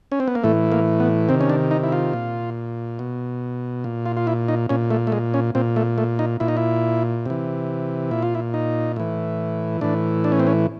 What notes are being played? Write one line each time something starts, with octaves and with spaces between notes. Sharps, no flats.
C#4
C4
B3
A#3
A2 E3 A3
A#3
B3
C3 D#3 C4
C#4
D4
D#4
E4
F4
A#2
B2
A#2
F4
F4
E4
D#4
A#2 C#4
A3
A3
G#3
C#4
A#2 C4
A3
A3
D#4
A#2 E4
D#4
E4
C3 E3
A#2 E4
F4
E4
D#4
A2 E3
A2 E3 D4
D4
C#4
C4
C#4